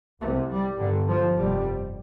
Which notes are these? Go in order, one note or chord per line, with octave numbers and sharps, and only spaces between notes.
C2 C3 A3
G3
G1 G2 D3
F3
F1 F2 C3 G3